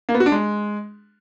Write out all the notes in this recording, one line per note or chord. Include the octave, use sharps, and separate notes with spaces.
A#3
B3
F#4
D4
G#3